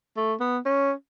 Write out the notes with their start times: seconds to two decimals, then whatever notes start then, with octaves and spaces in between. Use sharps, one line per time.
0.17 A3
0.40 B3
0.65 C#4